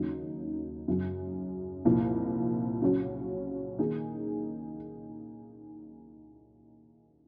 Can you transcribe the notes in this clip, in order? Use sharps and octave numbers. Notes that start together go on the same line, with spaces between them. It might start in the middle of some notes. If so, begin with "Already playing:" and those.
Already playing: D#2 C#3 F#3 A#3 D#4
F#2 C#3 F#3
C2 A#2 F3 A#3 D#4
C#3 F#3 C#4 F#4
D#3 A#3 D#4 G#4